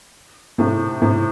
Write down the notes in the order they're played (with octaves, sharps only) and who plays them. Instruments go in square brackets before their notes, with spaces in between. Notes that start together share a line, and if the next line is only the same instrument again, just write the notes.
[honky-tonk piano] A2 C3
A2 C3